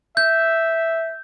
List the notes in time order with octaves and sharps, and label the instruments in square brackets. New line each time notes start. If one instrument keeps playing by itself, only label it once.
[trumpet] E5 [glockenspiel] G6